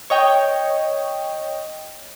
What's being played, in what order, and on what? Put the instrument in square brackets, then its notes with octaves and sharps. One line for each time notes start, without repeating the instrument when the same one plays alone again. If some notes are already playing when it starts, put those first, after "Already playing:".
[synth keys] C#5 D#5 G5